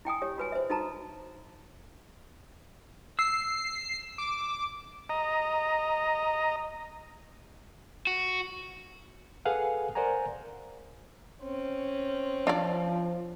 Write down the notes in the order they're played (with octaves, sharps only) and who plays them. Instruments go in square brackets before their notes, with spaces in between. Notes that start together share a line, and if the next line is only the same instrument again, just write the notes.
[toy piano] E4 G5 G#5 D#6
G4 C#5
F#4 B4 G#5
C5 E5
D#4 F#4 A4 A5 A#5
[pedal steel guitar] E6 [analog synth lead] C7
[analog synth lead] D6
[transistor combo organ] D#5 A#5
[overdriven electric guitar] F#4
[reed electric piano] G#4 A4 B4 F5 F#5 G#5
A#4 C5 D5 F#5 G#5 A#5
[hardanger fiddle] C4 C#4
[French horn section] F3 [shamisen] D4 F4 D5